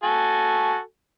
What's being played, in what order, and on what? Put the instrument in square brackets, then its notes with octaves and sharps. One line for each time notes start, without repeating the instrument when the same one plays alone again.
[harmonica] F#4 A4 G#5